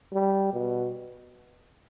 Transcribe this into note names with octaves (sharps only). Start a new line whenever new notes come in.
G3
B2